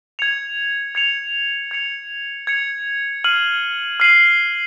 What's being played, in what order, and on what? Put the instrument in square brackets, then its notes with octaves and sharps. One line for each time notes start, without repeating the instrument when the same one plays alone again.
[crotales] G#6 C#7 F7
G#6 C#7 F7
G#6 C#7 F7
G#6 C#7 F7
F6 C7 D#7 F#7
F6 C7 D#7 F#7